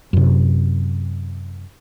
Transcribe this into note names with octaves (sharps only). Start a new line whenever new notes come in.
F#2 C3